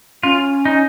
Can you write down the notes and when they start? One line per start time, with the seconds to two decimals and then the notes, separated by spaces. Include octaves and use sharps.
0.23 C#4 F4
0.65 D#4